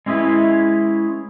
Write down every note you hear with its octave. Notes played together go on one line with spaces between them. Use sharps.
G#3 C#4 E4 G#4 B4